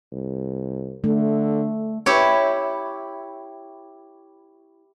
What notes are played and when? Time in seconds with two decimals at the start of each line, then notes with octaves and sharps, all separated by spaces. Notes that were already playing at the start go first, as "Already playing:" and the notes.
0.12 C2
1.04 D3 A3
2.06 E4 G4 C#5